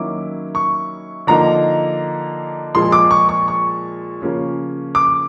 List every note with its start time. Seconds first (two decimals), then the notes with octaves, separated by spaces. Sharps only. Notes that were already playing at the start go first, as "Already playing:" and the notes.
Already playing: D#3 F#3 A#3 C#4 E4 D6
0.55 C#6
1.27 D3 F3 A#3 D#4 A#5
2.75 A#2 F3 G#3 C6
2.92 D6
3.11 C#6
3.29 C#6
3.48 C#6
4.21 C#3 F3 A#3 C#4 F4
4.95 D6